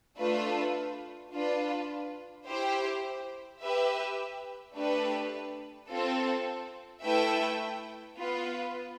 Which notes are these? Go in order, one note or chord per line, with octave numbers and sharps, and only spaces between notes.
A3 D4 F4 B4
D4 F4 B4
E4 G4 C5
G4 B4 E5
A3 D4 G4 B4
C4 F4 A4
A3 E4 B4 E5 G5
B3 F4 B4